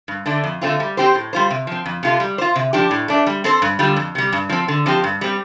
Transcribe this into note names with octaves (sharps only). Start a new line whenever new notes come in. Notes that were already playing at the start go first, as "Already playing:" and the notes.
G2
D3 A3 D4
F2
D3 A3 C4 F4
G3
C4 G4 C5
A2
G3 F4 C5
C3
F3 C4
F2
C3 A3 F4
G3
F4 C5
C3
F3 D4 G4
A2
A3 D4
G3
C4 A4 C5
G2
D3 G3 D4 F4
F2
C3 G3
G2
F3 C4
D3
F3 C4 G4
G2
G3 C4